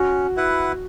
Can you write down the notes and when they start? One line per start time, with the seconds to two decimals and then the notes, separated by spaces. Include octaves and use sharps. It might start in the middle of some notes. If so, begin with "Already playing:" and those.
Already playing: C#4 F#4
0.36 E4 B4 F#5